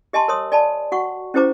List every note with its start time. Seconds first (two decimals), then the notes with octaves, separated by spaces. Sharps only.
0.13 G4 D#5 G#5 A5 C6
0.28 A#4 C#5 C6 D#6
0.52 D5 G#5 A5 B5
0.92 F#4 F#5 C#6
1.34 C#4 E4 G4 C5 A#5 D6